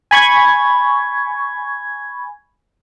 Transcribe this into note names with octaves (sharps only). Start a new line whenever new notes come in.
G#5 B5 C#6 G#6